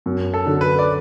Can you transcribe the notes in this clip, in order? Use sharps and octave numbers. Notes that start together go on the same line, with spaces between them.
F#2
A4
D3 F#3
B4
D5